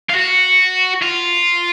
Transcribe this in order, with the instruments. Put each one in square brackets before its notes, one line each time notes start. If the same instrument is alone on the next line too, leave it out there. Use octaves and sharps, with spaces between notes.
[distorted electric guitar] F4
F#4
F4